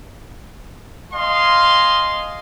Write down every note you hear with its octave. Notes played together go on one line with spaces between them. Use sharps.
D#5 F5 G#5 C6